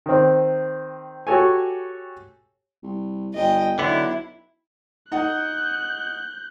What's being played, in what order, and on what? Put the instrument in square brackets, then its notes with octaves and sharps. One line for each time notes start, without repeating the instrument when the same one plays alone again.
[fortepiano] D#3 C4
F#4 G4 A4 C#5 G#5
[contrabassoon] C2
[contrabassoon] G1 [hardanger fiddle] D#5 G5
[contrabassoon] B1 [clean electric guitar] D3 B3 [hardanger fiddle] E4
[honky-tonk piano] D#4 F#5 [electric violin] F#6 G6